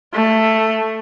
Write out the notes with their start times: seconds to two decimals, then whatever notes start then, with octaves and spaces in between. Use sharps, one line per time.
0.13 A3